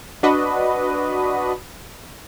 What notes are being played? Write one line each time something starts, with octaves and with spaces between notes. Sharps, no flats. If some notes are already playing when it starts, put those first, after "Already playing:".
D4 F#4 B4 D#5